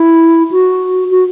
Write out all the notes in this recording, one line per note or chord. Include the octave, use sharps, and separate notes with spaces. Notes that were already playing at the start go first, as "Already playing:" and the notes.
Already playing: E4
F#4
F#4